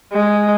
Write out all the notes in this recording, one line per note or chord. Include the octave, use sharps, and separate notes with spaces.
G#3